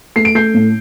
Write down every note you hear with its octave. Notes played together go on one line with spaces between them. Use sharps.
A3 C7
D7
A3 G6 C7
A2